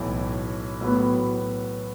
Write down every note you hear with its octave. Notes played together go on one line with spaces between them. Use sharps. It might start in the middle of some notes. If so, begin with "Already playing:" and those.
Already playing: B1 A2 E3
A2 F#3 B3